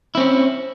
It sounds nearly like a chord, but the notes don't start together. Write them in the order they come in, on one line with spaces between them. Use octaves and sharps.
E4 C4 C#4